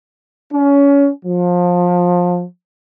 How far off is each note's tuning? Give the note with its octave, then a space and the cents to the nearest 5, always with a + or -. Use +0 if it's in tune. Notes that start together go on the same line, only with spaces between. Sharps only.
C#4 +25
F3 +25